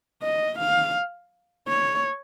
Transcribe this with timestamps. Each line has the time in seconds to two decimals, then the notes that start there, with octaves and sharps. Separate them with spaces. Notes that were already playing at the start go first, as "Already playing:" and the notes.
0.22 D#5
0.59 F5
1.68 C#5